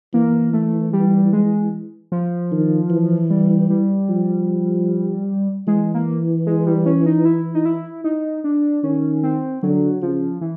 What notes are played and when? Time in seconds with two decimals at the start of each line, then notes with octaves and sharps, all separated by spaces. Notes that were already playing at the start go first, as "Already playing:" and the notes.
0.14 E3 A#3
0.53 A3
0.93 G3
1.33 G#3
2.12 F3
2.52 D#3
2.90 E3
3.30 G3
3.70 G3
4.09 F3
5.67 E3 G#3
5.94 A#3
6.47 G#3
6.67 G3
6.86 C#4
7.06 D#4
7.25 E4
7.55 D#4
7.65 E4
8.04 D#4
8.44 D4
8.84 D#3 C#4
9.23 C4
9.63 D3 F#3
10.02 C#3 F3
10.41 E3